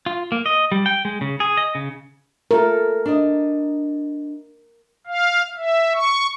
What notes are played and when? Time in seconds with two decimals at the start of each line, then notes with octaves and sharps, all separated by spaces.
0.06 F4
0.32 A#3
0.46 D#5
0.72 G3
0.86 G5
1.05 G#3
1.21 C#3
1.40 G#4
1.57 D#5
1.75 C#3
2.51 A3 F4 A4 A#4
3.06 D4 D#5
5.07 F5
5.57 E5
5.94 C#6